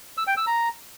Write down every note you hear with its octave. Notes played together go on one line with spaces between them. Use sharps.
E6
G5
E6
A#5